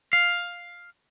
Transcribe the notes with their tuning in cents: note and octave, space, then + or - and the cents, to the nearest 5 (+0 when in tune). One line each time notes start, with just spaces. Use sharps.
F5 +5